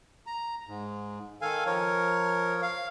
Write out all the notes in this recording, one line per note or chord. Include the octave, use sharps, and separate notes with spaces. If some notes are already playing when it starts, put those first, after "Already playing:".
A#5
G#2
D#3 A4 F5 G#5
F3 A#4 C#5
F5